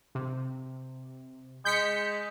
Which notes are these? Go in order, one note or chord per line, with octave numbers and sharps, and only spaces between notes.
C3
G#3 G6 B6 C#7